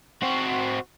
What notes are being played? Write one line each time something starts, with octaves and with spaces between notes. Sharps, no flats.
C4 F#4